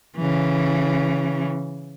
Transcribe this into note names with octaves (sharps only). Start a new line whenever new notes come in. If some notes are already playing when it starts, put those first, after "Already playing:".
C#3 E3